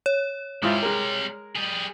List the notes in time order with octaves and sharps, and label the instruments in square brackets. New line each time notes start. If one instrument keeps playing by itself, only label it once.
[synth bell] C#5
[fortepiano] G#2 E4 F4 [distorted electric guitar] C3 G3
[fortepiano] G#3 A#4
[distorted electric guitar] G3 G#4